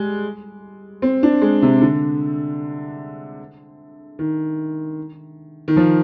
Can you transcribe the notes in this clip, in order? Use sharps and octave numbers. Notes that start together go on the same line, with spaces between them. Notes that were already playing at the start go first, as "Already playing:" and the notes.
Already playing: G3 G#3
C4
D4
G#3
C3
D3
D#3
D#3
F3